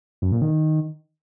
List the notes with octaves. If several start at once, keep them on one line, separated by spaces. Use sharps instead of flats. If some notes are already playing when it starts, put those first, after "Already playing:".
F#2
A#2
D#3